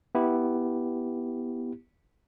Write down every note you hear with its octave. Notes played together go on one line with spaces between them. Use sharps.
B3 E4 G4